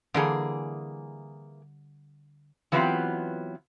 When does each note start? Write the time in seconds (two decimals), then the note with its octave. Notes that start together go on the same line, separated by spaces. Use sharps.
0.14 D3 E3 G3 A#3 G#4
2.72 E3 F#3 B3 C4 F4 G4